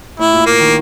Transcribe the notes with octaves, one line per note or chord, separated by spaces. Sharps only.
A2 E4
A#2
A#3
D#3